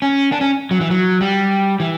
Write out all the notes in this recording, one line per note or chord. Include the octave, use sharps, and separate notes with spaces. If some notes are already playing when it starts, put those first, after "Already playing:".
C#4
D4
C#4
F#3
E3
F#3
G3
E3